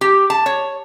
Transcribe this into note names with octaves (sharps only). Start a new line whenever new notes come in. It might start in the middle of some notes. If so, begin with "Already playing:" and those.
G4
A5
C#5